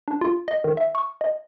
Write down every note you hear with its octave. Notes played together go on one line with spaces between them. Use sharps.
D4
F4
D#5
D#3
E5
C#6
D#5